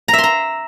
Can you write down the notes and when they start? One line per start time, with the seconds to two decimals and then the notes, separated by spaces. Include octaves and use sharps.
0.08 A#5
0.13 E5
0.18 C6
0.24 A#5